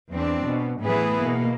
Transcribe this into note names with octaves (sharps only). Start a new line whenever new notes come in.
E2 C4 D4
B2
A2 E3 A3 B3 G#4 B4
B2 A#3